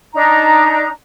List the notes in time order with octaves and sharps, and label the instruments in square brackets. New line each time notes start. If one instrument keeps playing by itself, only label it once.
[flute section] D4 D#4 A#5